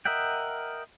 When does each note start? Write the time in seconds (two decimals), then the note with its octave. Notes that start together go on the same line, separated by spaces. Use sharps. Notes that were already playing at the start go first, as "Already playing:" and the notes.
0.05 A#4 D#5 E5 F#5 G5